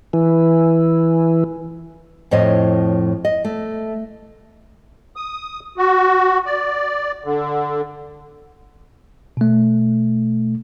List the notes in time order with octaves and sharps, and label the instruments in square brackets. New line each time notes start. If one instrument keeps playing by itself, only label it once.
[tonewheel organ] E3
[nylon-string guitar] F2 A2 F3 C#5 D#5
D#5
A3
[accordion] D#6
F#4
D5
D3
[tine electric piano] B2 A3